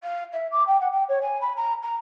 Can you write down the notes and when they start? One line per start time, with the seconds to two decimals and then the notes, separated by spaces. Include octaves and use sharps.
0.03 F5
0.32 E5
0.51 D6
0.67 G5
0.80 F#5
0.92 G5
1.08 C#5
1.21 G#5
1.41 B5
1.56 A#5
1.82 A#5